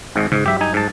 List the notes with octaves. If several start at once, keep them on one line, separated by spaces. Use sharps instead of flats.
G#1 G#2
G#2 C#3
G2 F#3 G3 G4 E5
D#4 G#5
G#2 A5